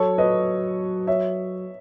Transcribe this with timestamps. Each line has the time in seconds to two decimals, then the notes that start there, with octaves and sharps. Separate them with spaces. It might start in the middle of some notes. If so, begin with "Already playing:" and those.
Already playing: F#3 A4 C#5
0.18 B4 D#5
1.07 C#5 E5